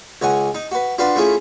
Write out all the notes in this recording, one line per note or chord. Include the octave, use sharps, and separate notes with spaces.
C#2 C#5 F#5 G#5
D#4
F#4 B4
D4 F4 F#4 B4 C6
A3 C#4 E4 F4 G#4